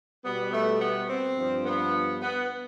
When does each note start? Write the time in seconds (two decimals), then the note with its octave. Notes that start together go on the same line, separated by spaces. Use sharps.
0.24 B2 G3 B3
0.52 A3
0.80 B3
1.08 C4
1.37 G2 F3
1.65 B3
2.21 B3